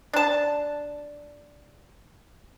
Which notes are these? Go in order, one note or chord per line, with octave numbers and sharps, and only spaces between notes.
D4 A5